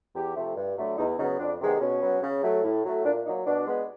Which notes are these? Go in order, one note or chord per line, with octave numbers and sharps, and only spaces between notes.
E2 G4
C3 F3 A3
G2
D3 F#3 A3
E2 D#4
C#3 F#3 B3 D#4
F2 D4
C3 D#3 G#3 B3
B2 C#4
F#3 B3
C#3
F#3 A3
A2
F#3 A3
A#2 D4
F#3 A#3 D#4
B2 D4
G#3 B3